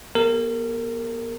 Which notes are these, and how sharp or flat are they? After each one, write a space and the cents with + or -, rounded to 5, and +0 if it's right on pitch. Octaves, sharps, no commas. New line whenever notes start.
B3 -45 G4 +40 A#4 -30